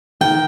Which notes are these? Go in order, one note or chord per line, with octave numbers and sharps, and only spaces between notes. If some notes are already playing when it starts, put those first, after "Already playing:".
D#3 G5